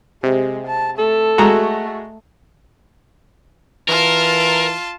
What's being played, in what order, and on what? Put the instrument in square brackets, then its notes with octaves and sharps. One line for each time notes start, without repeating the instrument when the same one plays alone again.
[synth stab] C3 [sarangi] G#3
[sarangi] A5
[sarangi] A3 [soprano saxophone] A4
[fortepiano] G#3 A#5 [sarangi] A3 [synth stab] F#4
[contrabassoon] E3 [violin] F4 A5 [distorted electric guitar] A#4